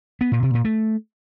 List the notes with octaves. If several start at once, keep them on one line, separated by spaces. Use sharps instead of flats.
B3
A#2
C3
A#2
A3